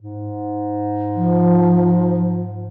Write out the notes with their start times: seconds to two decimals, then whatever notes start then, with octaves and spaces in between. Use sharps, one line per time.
0.02 G#2
1.15 F3